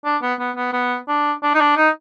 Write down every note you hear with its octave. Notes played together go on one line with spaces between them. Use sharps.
D4
B3
B3
B3
B3
D4
D4
D#4
D4
D#4